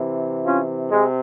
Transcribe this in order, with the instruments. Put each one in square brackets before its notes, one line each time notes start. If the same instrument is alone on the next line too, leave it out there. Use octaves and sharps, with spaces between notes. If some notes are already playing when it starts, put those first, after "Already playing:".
Already playing: [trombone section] C3 E3
C#4 F4
C3 G#3